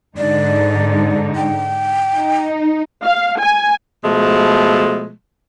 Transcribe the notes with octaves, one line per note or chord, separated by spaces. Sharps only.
G#2 D3 D#4 D5
G5
D#4
F5
G#5
B2 F3 G#3 A3